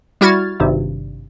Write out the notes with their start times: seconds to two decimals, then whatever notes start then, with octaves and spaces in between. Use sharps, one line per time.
0.21 G3 E4 F#4 F6 G#6 A6
0.60 G#1 G2 C3